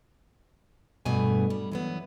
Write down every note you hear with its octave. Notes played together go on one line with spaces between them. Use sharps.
E2 G2 B2 A3 G#5
G3
E3 F#3 B3